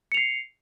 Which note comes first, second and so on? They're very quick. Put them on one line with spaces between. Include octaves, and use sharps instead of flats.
C#7 F7 C7